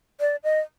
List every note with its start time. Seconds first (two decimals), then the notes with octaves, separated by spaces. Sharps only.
0.20 D5
0.44 D#5